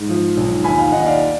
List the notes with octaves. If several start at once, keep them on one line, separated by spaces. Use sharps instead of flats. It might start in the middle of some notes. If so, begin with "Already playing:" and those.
Already playing: G#2
F3
B1
D#2 G#5 B5
F5 G#5
D#2 D#5 F#5
D5 F5